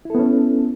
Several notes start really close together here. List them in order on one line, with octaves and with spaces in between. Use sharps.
E4 A4 B3 C#4